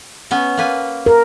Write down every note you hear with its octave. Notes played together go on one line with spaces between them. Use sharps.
B3 C#4
A#3 B4 G#5
A#4